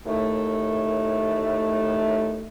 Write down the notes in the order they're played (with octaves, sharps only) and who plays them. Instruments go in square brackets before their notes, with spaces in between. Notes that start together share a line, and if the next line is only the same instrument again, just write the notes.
[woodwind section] D#2 A2 A3